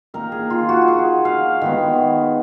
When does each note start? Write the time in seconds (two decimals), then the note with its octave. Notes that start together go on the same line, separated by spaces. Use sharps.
0.14 D#3 A#3 D#4 A#4
0.32 G#4
0.50 F4
0.69 F#4
0.88 G#4
1.25 F5
1.62 D#3 G#3 B3